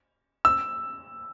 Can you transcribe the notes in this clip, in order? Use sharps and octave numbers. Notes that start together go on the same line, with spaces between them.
E6